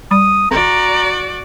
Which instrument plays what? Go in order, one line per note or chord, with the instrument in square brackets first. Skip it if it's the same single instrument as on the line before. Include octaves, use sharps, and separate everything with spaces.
[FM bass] G3 [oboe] D#6
[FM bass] G#1 [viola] F#4 D5 [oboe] A#5